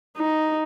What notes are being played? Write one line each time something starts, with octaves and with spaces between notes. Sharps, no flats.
D#4